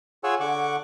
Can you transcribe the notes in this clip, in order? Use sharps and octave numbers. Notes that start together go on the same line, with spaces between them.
F4 G#4 C#5 F#5 G#5 E6
D3 F#5 C#6 D6